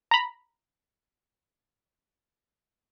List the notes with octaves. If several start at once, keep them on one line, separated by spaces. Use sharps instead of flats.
A#5 B5